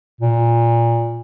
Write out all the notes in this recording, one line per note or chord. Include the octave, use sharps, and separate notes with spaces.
A#2